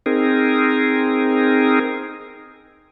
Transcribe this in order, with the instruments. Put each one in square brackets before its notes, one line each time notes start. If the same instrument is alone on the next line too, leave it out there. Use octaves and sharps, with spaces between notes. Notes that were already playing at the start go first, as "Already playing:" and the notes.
[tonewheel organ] C4 D#4 G#4 A#4